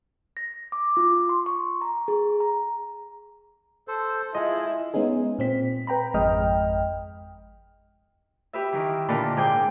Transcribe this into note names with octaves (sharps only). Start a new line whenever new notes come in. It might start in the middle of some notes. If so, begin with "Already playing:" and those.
A#6
D6
F4
C6
C#6
A#5
G#4
A#5
A4 C5
G#3 E4 F4 G#4 D#5
G#3 B3 C#4 D#4 G#4
A#2 C4 B6
B4 G5 A#5 B5
G#1 F2 G#3 D#5 G5 F6
G4 B4 E5
D#3 E3
A#2 D3 A4 B5
G#2 G#4 G5 G6